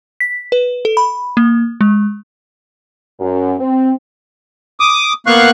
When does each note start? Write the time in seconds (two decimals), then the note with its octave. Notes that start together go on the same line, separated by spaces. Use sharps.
0.20 B6
0.52 B4
0.85 A4
0.97 B5
1.37 A#3
1.81 G#3
3.20 F#2
3.60 C4
4.80 D6 D#6
5.27 A#3 B3 F5 C#6 F#6